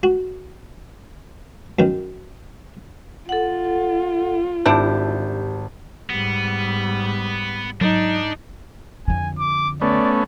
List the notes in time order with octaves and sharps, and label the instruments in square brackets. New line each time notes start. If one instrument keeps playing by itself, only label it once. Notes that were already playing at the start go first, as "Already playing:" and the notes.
[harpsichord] F#4
F#2 D#3
[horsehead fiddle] F4 [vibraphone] A4 F#5
[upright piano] G#1 A5 [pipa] G3 D4 E4 [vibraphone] G4
[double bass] G#2 G3 [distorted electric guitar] B3
[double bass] G#2 [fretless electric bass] F#3 [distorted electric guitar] D4 [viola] D#4
[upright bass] F2 D3 [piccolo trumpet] G#5
[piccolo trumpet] D6
[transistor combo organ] A3 B3 C#4 [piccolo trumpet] D5